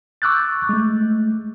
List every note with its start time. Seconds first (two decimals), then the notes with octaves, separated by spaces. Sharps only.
0.22 C#6 D6 E6 F#6 G6 A6
0.69 G#3 A3